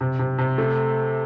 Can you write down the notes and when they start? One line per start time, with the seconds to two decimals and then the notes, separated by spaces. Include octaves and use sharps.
0.01 C3
0.19 C3
0.38 C3
0.58 A3